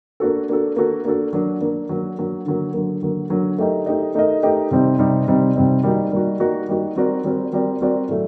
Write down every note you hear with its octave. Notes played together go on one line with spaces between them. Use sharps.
A#3 D4 F#4 A4
A#3 D4 F#4 A4
A#3 D4 F#4 A4
A#3 D4 F#4 A4
F#3 A#3 D4
F#3 A#3 D4
F#3 A#3 D4
F#3 A#3 D4
D3 F#3 A#3
D3 F#3 A#3
D3 F#3 A#3
D3 F#3 A#3
A3 D#4 G4 A#4 D#5
A3 D#4 G4 A#4 D#5
A3 D#4 G4 A#4 D#5
A3 D#4 G4 A#4 D#5
C3 G3 C4 D#4
C3 G3 C4 D#4
C3 G3 C4 D#4
C3 G3 C4 D#4
G3 A#3 D#4 F#4
G3 A#3 D#4 F#4
G3 A#3 D#4 F#4
G3 A#3 D#4 F#4
G3 C4 F#4 A#4 D5
G3 C4 F#4 A#4 D5
G3 C4 F#4 A#4 D5
G3 C4 F#4 A#4 D5
A2 F#3 A3